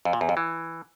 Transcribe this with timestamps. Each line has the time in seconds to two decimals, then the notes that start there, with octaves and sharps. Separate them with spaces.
0.05 F2
0.13 A#2
0.21 E2
0.29 F2
0.37 E3